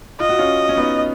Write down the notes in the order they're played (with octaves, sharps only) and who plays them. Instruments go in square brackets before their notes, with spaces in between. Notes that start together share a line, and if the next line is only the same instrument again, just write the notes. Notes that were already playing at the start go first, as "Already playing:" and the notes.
[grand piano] F4 [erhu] D#5
[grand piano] F#4
C#4 F4
C#4
B3 D#4